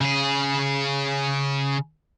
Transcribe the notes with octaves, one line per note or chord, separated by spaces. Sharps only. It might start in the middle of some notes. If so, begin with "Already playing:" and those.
C#3 G#4